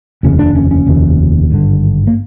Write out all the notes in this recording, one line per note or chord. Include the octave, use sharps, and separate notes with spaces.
F1 D#2 C#3 C#4
D4
C#4
C#4
F1 D#2 C#3
G#1 G2 D3
A#3